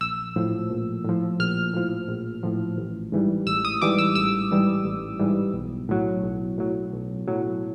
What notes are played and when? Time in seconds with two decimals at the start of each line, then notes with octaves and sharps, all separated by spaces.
0.01 A#1 E6
0.36 A2 F3
0.70 A#1
1.05 A2 F3
1.39 A#1 F6
1.73 A2 F3
2.08 A#1
2.43 A2 F3
2.78 A1
3.12 G#2 E3 G3
3.47 A1 E6
3.65 D#6
3.82 G#2 E3 G3 D6
3.98 E6
4.15 A1 E6
4.51 G#2 E3 G3
4.85 A1
5.19 G#2 E3 G3
5.54 B1
5.89 A2 F#3
6.23 B1
6.58 A2 F#3
6.92 B1
7.27 A2 F#3